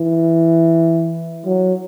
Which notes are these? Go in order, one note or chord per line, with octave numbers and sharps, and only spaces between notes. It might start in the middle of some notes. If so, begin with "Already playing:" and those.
Already playing: E3
F#3